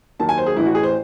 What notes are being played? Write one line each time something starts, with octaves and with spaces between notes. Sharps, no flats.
D#2 D#3 F#3 A5
G#5
C5
G#4
A1 A2 E3 E4
F#4
G#4
C5